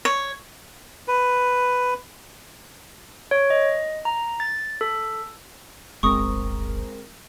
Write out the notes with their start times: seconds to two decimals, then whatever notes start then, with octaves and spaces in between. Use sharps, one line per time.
0.05 C#5
1.08 B4
3.31 C#5
3.50 D#5
4.05 A#5
4.40 A6
4.81 A4
6.03 D1 G1 G#3 C4 A#4 C#6 D#6